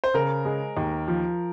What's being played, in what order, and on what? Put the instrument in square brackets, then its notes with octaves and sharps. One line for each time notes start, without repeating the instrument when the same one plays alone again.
[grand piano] C5
[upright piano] C#3 [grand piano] A#4
[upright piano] G#3
D#2
F3